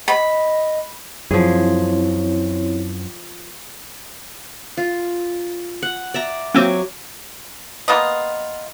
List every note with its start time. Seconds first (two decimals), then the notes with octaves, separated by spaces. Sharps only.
0.08 D#5 B5
1.31 F#2 E3 F3 C4 E4 G#4 C#5
4.77 F4
5.83 F#5
6.14 D5 E5 A#5
6.55 F#3 A#3 C4 G#5 D6
7.88 A#3 B3 F4 D#5